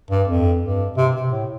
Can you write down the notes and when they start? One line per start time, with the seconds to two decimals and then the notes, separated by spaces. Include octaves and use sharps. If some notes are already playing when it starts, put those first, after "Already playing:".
0.11 G2
0.28 F2
0.63 G2
0.97 C3
1.15 C3
1.32 A2